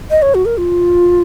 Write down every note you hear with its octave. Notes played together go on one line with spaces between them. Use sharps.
D#5
C#5
F#4
A#4
F4